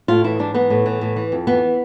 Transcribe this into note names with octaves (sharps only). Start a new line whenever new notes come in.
A2 F4
E3 E4
G#2 D4
E3 B3
A2
E3
A2
E3
F2
E3 B3